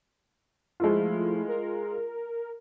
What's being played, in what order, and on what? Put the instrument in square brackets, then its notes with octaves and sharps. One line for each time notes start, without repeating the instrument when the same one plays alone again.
[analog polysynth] F3 A3 E4 [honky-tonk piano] G#3 F4
[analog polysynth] A#4